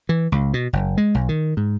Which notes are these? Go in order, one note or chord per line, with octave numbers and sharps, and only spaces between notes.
E3
C#2
B2
F#1
G#3
B1
D#3
G#2